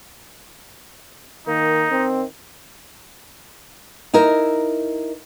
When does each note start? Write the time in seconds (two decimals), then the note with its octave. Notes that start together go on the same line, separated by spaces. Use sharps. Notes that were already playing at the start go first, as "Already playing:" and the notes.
1.47 D#3 A#3 D#4
1.91 D#3 C4
4.14 D#4 E4 A#4